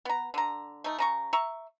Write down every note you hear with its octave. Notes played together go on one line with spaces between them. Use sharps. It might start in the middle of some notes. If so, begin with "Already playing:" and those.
B3 A#5
D3 A#5
A3 D#4
C#3 A#5 C#6
E5 A#5 C#6